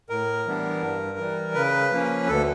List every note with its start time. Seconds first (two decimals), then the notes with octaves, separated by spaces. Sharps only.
0.09 A2 A#4
0.46 E3 G3 B3 D4
0.82 G2
1.18 E3 G3
1.54 C#3 B4
1.92 F3 A#3 C#4
2.27 D2 A4